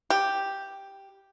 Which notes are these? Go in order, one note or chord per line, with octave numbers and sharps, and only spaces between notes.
G4